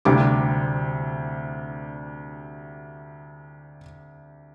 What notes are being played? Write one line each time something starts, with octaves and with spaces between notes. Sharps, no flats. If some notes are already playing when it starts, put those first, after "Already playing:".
D2 C3 G3 D6